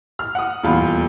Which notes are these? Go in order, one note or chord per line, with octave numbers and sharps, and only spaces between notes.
F6
F#5 D#6
D#1 E2 F4 B5